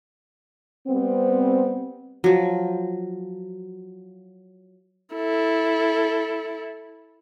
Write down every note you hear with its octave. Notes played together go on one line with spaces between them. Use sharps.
G3 B3 C4
F3 F#3
E4 A4